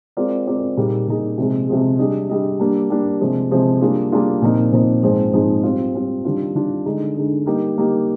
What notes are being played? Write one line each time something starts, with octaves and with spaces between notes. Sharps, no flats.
G#3 C4 F4 A#4 D5
G#3 C4 F4 A#4 D5
A#2 G3 A#3 D#4 G#4
A#2 G3 A#3 D#4 G#4
C3 F3 G#3
C3 F3 G#3
G3 D4 G#4 D#5
G3 D4 G#4 D#5
G3 A#3 D4
G3 A#3 D4
C3 F3 G#3
C3 F3 G#3
G3 A#3 D4 F4 G#4
G3 A#3 D4 F4 G#4
A#2 F3 C4 D#4 A#4
A#2 F3 C4 D#4 A#4
G#2 F3 G#3 C4 D#4
G#2 F3 G#3 C4 D#4
G3 C4 F4
G3 C4 F4
D#3 G3 D4 F4
D#3 G3 D4 F4
D3 G#3 D#4
D3 G#3 D#4
G3 A#3 D#4 G4 A#4
G3 A#3 D#4 G4 A#4